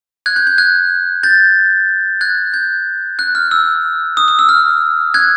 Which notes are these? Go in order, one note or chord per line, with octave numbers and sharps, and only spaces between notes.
F#6 G#6
G6
G6
F#6 G#6
G6 A6
F#6 G#6
G6
F#6
F6
E6
D#6
D#6
E6
F6
F#6 G#6